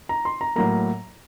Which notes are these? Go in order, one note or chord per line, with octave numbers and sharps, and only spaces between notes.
A#5
C6
A#5
A2 F#3 A#3 A#5